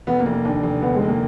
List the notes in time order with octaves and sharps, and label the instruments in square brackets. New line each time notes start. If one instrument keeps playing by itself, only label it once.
[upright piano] F1 [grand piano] B3
[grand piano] A#3
[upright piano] F1
[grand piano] A#3
[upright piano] D#2 [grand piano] D4
[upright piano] F1
[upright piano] D3 [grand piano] B3
[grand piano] G#3
[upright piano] F1
[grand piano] A#3